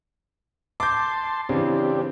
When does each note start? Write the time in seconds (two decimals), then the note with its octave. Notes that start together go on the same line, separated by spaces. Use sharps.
0.80 A5 C6 D6 G6
1.49 C#3 E3 C4 D4 G4